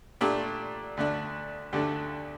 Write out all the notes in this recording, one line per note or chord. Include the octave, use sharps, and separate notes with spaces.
A#2 A3 D4 G4
D2 D3 A3 D4
D2 D3 A3 D4 G4